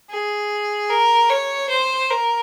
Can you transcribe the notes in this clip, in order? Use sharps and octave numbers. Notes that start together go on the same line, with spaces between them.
G#4
A#4
C#5
C5
A#4